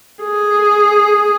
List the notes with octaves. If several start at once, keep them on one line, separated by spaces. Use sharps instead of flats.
G#4